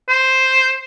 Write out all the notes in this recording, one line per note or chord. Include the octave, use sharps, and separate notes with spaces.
C5